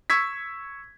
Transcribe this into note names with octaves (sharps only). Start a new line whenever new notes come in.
C#6 E6 G#6 B6